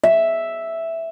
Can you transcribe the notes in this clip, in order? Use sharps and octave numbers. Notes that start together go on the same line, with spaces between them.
E5